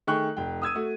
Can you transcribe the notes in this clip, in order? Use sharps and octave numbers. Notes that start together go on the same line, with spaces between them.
D#3 A3 G#4 G5 C#6 F#6
F1 G5
D#6 E6 G#6 D#7
A3 F#4